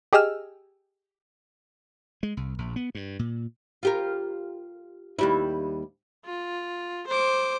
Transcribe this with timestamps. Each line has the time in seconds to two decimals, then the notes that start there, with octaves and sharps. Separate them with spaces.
0.13 G4 G#4 D#5 E6 F6
2.23 G#3
2.37 C2
2.58 A#1
2.76 B3
2.95 G2
3.19 A#2
3.83 F4 G4 A#4
5.19 D#2 G3 E4
6.25 F4
7.07 C5 D6